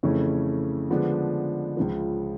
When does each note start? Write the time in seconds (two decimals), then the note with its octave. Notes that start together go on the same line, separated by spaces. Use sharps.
0.03 F2 C#3 E3 A3 C#4
0.90 D3 F3 G#3 B3 D4
1.77 C#2 C#3 F3